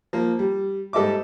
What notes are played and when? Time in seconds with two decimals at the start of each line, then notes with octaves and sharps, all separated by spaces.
0.13 F3 A#3
0.39 G3
0.93 G#2 G3 A4 D#5 E5 D6